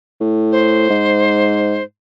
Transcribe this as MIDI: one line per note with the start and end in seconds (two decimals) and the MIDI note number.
0.20 0.88 45
0.52 1.83 72
0.90 1.81 44